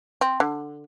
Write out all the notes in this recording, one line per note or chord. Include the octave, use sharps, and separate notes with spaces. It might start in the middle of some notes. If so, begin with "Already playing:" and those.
C4
D3